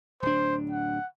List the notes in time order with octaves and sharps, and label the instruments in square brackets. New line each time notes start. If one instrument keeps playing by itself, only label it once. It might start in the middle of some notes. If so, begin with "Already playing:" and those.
[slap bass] D1 D4 [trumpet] C5
[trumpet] F#5